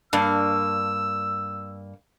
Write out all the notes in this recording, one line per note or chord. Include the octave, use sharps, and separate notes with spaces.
G2 A#3 E6